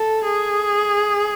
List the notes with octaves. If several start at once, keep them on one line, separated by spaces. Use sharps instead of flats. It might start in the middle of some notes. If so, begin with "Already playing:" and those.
Already playing: A4
G#4